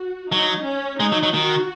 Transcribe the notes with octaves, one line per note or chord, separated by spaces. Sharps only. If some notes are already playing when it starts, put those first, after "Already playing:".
Already playing: F#4
F#3 D#4
C#4
G#3 D#4
F#3
F#3
D#3 F#4